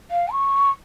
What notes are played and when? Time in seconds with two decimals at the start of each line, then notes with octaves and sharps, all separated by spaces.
0.11 F5
0.31 C#6